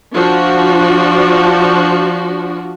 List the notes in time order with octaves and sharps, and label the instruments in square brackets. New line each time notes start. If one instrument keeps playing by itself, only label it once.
[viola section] F3 D4 F#4